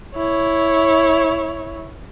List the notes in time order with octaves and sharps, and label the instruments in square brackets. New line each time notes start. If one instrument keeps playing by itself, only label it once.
[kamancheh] E4 C#5